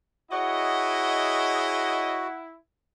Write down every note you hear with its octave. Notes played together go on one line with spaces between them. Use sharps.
E4 F#4 G#4 C#5 D#5 F#5